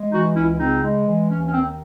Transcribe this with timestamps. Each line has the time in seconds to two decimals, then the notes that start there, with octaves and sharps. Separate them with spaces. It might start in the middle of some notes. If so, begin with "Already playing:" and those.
Already playing: G#3
0.12 E3 D#4 F#4
0.35 C#2 C#4 E4
0.59 C#3 C4 D#4
0.83 G#3
1.07 E3
1.31 D#2 C#4
1.47 C#4
1.53 D#3 C4